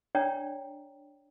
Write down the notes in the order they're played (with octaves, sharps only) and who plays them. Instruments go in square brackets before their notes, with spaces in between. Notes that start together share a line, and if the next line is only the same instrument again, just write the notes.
[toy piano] D4 C#5 D5 G5 A#5